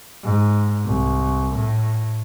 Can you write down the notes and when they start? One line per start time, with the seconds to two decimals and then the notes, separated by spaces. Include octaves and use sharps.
0.24 G#2
0.86 C2
1.56 A2